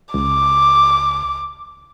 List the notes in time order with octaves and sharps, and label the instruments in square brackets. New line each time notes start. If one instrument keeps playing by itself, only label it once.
[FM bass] C#2 [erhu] D6